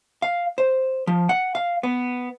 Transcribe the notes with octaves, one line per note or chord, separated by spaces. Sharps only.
F5
C5
F3
F#5
F5
B3